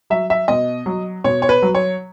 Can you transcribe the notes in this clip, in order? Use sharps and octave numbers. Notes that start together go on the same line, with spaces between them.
F#3 E5
E5
B2 D#5
F#3
B2 C#5
C#5
B4
F#3
C#5